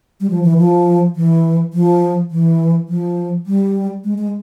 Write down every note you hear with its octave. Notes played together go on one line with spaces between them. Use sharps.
G3
F3
E3
F3
E3
F3
E3
F3
G3
G#3
G#3